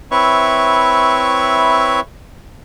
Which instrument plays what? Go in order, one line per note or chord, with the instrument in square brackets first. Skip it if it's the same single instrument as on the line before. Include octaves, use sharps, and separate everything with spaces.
[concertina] C4 E4 B4 C#5 E5 C#6